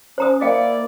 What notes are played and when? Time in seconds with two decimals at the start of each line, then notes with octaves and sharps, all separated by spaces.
0.18 C#4 C5 A#5 D#6
0.41 A#3 E4 D5 D#5 F5 G5